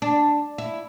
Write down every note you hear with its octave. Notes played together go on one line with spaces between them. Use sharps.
D4
E4